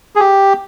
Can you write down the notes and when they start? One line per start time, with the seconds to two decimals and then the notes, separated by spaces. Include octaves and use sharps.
0.16 G#4
0.20 G4